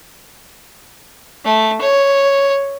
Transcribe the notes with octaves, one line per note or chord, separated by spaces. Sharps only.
A3
C#5